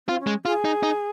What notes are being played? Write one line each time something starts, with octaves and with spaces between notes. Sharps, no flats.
C4 F4
C#4
G#3
F4 G#4
D#4
D#4